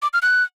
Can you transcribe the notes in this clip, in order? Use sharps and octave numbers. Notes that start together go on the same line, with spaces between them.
D6
F6
F#6